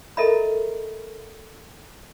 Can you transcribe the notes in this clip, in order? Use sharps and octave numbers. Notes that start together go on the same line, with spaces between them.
A4 A#4 D#5 E5 A#5 B5